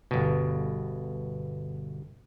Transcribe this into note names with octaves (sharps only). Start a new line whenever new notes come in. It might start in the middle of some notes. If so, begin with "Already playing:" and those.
G1 B2